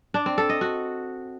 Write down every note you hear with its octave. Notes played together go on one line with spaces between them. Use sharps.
D4
C4
A4
D#5
F#4